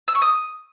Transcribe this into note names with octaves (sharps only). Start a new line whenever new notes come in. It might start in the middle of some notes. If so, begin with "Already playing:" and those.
E6
C#6
D#6